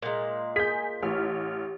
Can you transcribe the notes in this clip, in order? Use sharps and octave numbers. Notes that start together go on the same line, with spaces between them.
A#2 G#3
G#4 G6 B6
A1 G4 F6